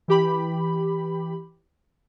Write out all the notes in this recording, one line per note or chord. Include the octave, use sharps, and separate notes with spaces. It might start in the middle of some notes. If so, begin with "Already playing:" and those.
E3 G4 B5